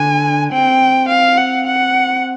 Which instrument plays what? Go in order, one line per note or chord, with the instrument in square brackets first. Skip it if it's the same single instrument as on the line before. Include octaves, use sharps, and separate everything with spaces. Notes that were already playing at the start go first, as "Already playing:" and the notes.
Already playing: [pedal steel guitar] D3 D4 [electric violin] G#5
[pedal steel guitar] C4 [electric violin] G5
[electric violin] F5
F#5
F#5